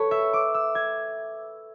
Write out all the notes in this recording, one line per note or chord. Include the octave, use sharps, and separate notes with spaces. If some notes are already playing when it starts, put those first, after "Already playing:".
Already playing: A4 B4 C#5
E5
D6
E6
G#6